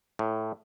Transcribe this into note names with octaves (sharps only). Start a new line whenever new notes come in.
A2